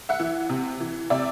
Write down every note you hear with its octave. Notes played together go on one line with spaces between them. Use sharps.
E5 F#5
E3
C3
E3
C3 D5 E5